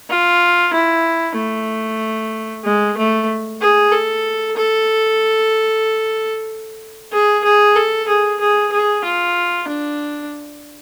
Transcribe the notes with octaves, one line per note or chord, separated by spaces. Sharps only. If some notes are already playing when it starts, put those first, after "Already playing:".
F4
E4
A3
G#3
A3
G#4
A4
A4
G#4
G#4
A4
G#4
G#4
G#4
F4
D4